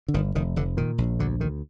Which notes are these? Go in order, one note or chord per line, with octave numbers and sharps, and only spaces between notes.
D3
G1 D#3
F1 D#3
F1 D3
A#2 D#3
A#1
D2 D3
D2 D#3